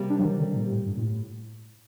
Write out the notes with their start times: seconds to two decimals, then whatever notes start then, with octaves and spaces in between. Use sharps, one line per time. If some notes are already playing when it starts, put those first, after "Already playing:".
Already playing: C3 G3 A#3
0.10 D4
0.19 F#3
0.25 D#3
0.40 D3
0.56 A#2
0.71 A2
0.86 G2
0.97 A#2
1.01 A2